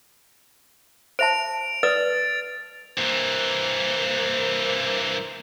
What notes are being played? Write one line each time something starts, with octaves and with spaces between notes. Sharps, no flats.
C5 E5 A5 D7 F7
B4 D5 D#6 A6
G2 E3 A#3 C5